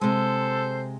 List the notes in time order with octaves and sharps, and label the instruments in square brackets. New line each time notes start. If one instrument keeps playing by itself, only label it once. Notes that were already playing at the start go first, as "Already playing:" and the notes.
[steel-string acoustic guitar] C3 G#3 [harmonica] A4 C5